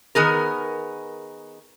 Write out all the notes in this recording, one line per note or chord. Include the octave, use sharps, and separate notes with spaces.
D#3 B3 G#4 A#4